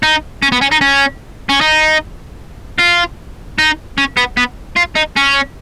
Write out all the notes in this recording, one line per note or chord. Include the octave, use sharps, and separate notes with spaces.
D#4
C#4
B3
C#4
D#4
C#4
C#4
D#4
F4
D#4
C#4
B3
B3
F4
D#4
C#4